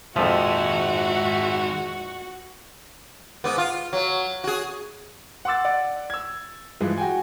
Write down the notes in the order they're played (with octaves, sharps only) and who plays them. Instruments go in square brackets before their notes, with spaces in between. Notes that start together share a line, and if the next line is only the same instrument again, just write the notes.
[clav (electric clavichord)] F2 A#2 F3 [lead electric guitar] D#3 G#3 [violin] F#4 [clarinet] E5
[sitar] G#2 B3
F4
F#3
F#4 G#4
[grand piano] F#5 C6 D6 E6 A6
D5 F#5
E6 G#6
G2 E3 F3 G#3
F#4 G5 G#5